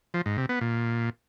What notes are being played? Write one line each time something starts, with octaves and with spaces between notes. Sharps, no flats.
F3
G#2
C3
B3
A#2